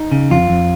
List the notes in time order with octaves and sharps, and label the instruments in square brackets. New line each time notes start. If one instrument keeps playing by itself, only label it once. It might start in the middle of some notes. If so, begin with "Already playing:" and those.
Already playing: [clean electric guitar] D#4
C#3
F2 F4
F2